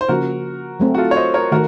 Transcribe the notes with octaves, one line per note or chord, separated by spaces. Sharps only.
C5
C#3 F3 A#3 F#4 A#4
F#3 A3 C4
F#4
F4 A4
C#5
C5 D#5
A#4 C#5
D#3 A3 F#4 A#4